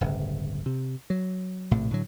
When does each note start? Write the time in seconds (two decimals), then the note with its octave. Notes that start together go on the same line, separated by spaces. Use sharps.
0.01 D1 G1 C#3
0.66 C3
1.10 F#3
1.71 A#1 A2 C3
1.91 A2 D3 F#3